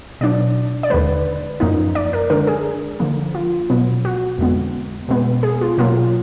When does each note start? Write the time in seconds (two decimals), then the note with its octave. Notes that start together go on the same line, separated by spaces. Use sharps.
0.21 B2 F#3 D4 D5
0.83 D5
0.90 D#2 D3 G#3 B4
1.60 F#2 F3 A#3 D#4
1.95 D5
2.13 A#4
2.30 D3 G#3 D4 A#4
2.47 G#4
3.00 D3 F3 A#3
3.35 F4
3.70 B2 F#3 B3
4.05 F#4
4.39 F2 D3 G#3 B3
5.08 B2 G#3 B3
5.43 G#4
5.61 F4
5.78 B2 F#3 A#3 F4